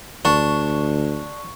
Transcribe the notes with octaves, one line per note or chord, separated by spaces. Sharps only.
D2 D4 C#6